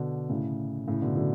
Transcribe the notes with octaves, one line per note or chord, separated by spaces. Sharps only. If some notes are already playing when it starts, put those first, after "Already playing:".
Already playing: B2 D3
A2 C#3
A2 C#3
B2 D3
D3 F#3